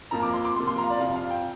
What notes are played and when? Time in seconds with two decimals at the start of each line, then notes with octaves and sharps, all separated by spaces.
0.11 F2 F3 A#3 A#5
0.23 D6
0.33 C6
0.45 D6
0.56 C3 F3 A#3 C6
0.67 C6
0.78 A#5
0.84 F5
0.90 D5
1.00 F2 C3 F3 F5
1.16 F5
1.31 G5